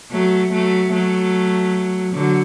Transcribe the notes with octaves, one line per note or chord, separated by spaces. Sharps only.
F#3 A3
F#3 A3
F#3 A3
D3 F#3